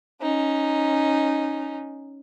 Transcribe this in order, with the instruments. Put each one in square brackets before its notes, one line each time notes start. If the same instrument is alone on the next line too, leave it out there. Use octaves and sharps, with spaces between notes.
[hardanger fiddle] C#4 D#4